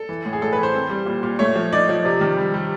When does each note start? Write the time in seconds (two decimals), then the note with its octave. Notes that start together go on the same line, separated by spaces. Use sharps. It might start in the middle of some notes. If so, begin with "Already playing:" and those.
Already playing: A4
0.09 E3
0.26 A2
0.33 G#4
0.42 A2 A4
0.53 B4
0.58 E3 C5
0.75 C4
0.90 G3
1.06 A#2
1.23 A#2
1.39 A3 C#5
1.56 F3
1.73 D#4 D5
1.89 F3
2.05 C3
2.21 D#3
2.37 G3
2.54 G3